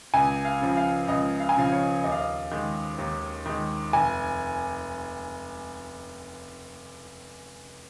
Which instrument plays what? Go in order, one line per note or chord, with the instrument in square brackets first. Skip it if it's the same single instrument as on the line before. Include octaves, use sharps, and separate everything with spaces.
[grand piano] C#2 G#5
F5
C#3 F3
F5
C#2 D#5
F5
G#5
C#3 F3 F5
C#5
D#2 D#5
F5
D#5
D#3 G#3
D#2
D#3 G#3
F1 G#5